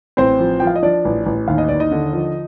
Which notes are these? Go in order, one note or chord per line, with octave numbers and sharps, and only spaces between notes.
A1 C4 C5
F3
F3 G5
F5
D#5
F3 D4 D5
A1
A1
D#2 F5
D#5
D#2 D5
D#4 D#5
D3
F3